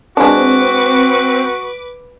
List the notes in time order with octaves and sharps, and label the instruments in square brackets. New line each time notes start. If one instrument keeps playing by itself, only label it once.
[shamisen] G#3 D4 [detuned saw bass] C4 [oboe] F#4 [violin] B4 D6